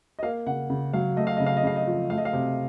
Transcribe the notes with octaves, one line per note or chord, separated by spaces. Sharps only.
D#5
A#3 F5
C#3 F#5
C#3
F#3 F5
A3 D#5
F5
C#3 D#5
F5
D#5
C#3 F5
D#5
F3
A3 F5
D#5
F5
C3